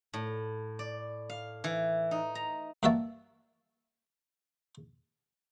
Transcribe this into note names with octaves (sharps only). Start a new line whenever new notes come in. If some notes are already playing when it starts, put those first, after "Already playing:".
A2
D5
F5
E3
D#4
A#5
G2 A#3 F#4 E5 A5